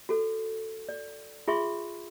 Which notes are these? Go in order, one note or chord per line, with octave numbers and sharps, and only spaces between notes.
F#4 A4
D5
F4 G#4 E5 C6 C#6